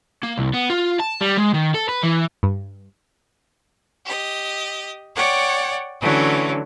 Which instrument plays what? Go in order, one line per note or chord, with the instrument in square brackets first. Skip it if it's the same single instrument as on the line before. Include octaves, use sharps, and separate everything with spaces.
[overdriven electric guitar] A#3
C2
B3
F4
A5
G3
G#3
D#3
A4
B4
E3
[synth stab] G2
[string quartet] G4 D#5
C#5 D5 F#5 G5
D3 E3 F#3 A3 C#4